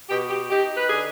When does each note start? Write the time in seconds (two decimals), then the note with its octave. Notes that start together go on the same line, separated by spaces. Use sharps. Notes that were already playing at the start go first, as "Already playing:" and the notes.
0.10 B2 G4
0.30 G4
0.49 D#4 G4
0.77 B4
0.89 D3 G#4